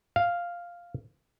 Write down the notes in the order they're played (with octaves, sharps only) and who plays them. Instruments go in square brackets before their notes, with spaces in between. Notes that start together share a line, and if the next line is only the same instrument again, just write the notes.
[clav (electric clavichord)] F5